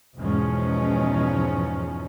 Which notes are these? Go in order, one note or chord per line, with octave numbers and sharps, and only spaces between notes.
E2 G#2 B2 F3 G#3 C#4